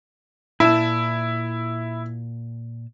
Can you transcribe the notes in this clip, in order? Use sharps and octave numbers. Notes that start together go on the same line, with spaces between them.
A#2 E4 A5